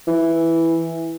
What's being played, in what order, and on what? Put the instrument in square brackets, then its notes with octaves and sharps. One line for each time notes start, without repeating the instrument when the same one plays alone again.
[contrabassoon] E3